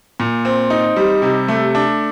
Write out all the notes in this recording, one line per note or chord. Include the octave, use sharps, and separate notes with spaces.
A#2
C4
D#4
G3
C3
A3
D4